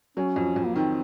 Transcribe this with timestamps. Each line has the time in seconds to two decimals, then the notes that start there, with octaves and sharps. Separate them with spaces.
0.17 F#3 C#4
0.36 F2
0.56 F2
0.66 A#3
0.75 D#3 C4